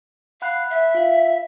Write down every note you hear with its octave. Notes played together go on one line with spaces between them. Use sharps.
F5 F#5 B5 F#6
E5
F4 F5